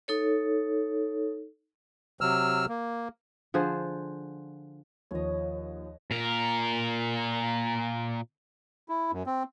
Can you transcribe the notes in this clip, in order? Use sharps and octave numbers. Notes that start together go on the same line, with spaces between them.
D#4 A4 C#5
C3 F#3 E6 F6
A#3
D3 F3 G#4 C5
D#2 F3 C#5 D#5
A#2 A#4
E4
F#2
C4